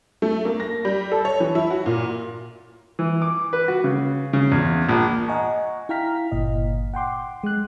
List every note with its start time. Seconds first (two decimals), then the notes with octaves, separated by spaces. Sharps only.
0.22 A3
0.45 A#3
0.60 A#6
0.85 G3
1.12 A4
1.25 C#5
1.40 E3
1.55 E4
1.70 F#4
1.86 A#2
2.99 E3
3.22 D6
3.53 B4
3.68 F#4
3.84 C#3
4.33 C#3
4.52 E2
4.89 A#1
5.28 D#5 F#5 G#5 A#5 C#6
5.89 E4 F5 G5 A#5 F6 B6
6.31 G1 A#2 D#5
6.94 F#5 G5 C6 D6
7.44 G#3 F#6